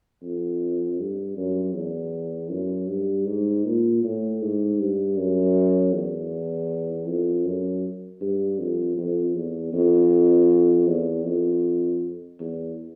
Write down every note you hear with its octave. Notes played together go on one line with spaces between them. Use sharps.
F2
G2
F#2
E2
F#2
G2
G#2
A#2
A2
G#2
G2
F#2
E2
F2
F#2
G2
F2
F2
E2
F2
E2
F2
E2